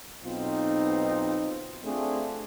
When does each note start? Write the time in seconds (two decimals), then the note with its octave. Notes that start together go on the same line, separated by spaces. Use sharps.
0.24 B1 B2 C4 D#4 F4
1.85 A3 C4 D4 F4 G#4